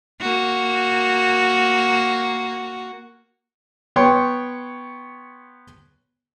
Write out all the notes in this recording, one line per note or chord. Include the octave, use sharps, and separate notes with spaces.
A#3 F#4
B3 C#5 G5 C6 C#6